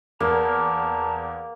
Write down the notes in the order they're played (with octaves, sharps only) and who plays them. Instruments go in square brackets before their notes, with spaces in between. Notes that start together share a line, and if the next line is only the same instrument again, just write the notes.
[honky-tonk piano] E2 [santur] A#3 [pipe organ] A5 A#5